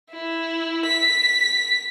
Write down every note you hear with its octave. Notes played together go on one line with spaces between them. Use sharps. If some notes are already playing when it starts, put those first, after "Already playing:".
E4
B6